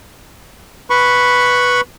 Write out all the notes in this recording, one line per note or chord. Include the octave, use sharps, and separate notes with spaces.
B4 B5 C#6